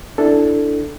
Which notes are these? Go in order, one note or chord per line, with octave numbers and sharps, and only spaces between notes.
D4 E4 A4